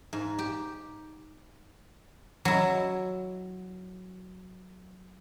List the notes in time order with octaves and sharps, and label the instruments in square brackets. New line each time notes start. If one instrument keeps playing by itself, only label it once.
[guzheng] G#2
G4
F#3 E4